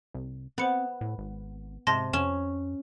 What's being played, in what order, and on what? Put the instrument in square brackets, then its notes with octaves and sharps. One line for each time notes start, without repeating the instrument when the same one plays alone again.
[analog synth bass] C2
[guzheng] B3 [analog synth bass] C4 [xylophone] C5 C#7 F#7
[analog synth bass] A2
G#1
[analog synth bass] G#2 [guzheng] C3 [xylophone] A5 C6 A#6
[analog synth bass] F2 [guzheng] C#4 [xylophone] E7